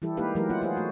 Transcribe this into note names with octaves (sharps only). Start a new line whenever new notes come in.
E3 G3 E4 G4 A4
G#3 A#3 D#4 G4 B4 F5
E3 F#3 G#3 A3 G4 A#4
B3 F4 F#5
F4 G#4 C5
A3 F#4